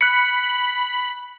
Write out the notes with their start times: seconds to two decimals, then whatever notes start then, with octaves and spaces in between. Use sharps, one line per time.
0.01 B5 F#6 C#7